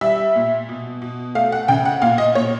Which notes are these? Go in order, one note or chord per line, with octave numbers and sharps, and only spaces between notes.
G3 E5
A#2
B2
B2
A3 F5
F#5
C#3 G5
F#5
A#2 F5
D#5
A#2 C#5